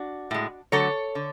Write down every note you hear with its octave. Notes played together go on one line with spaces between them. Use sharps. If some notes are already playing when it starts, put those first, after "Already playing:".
Already playing: D4 F#4
A2 G#3
D3 F#3 A3 A4 C#5
D3